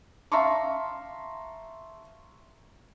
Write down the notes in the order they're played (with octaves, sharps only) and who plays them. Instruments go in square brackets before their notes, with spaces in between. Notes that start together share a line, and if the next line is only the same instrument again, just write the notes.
[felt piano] E5 F5 A5 A#5 C6 C#6